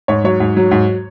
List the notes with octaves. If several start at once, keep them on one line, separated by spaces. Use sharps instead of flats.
G#2 C#5
F#3 C#5
G#2
F#3
G#2